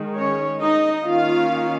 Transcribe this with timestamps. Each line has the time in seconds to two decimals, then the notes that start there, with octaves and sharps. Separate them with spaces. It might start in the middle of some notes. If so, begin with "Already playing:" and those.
Already playing: D#3 G#3
0.15 C#4 C#5
0.60 D#4 D#5
1.05 D#3 A#3 C#4 F4 F5